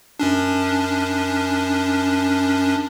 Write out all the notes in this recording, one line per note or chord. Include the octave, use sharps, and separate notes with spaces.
F#2 C#4 D4